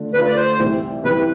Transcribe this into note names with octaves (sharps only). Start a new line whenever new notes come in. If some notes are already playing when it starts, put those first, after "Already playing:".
Already playing: D3 A3 D4 F4
D3 A3 D4 F4 B4
D5
C5
C2 C3 E3
C2 C3 E3 B4